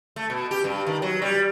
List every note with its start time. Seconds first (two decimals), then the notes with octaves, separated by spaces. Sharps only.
0.16 A3
0.30 B2
0.51 G4
0.64 G2
0.86 D#3
1.02 F#3
1.22 G3